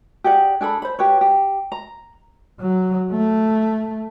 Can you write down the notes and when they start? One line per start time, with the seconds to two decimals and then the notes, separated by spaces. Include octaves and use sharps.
0.24 G4 G#4 D5 F#5
0.61 D4 G#4 A4 B5
0.82 C5 B5
0.99 G4 B4 C#5
1.21 G4
1.72 A#5
2.61 F#3
3.11 A3